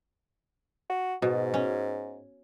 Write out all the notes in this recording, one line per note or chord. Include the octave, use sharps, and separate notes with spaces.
F#4
G#2 B2
C#4